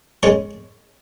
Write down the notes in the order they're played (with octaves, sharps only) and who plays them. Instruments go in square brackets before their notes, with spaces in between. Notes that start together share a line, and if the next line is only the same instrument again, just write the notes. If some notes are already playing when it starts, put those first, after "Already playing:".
[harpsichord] G#3 C#4 C#5